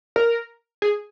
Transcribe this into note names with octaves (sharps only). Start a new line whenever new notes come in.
A#4
G#4